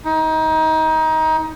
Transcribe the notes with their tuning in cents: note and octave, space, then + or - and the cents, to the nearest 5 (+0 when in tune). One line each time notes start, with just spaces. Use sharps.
D#4 +25